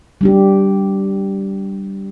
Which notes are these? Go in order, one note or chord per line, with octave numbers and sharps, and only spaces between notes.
G3 D4 G4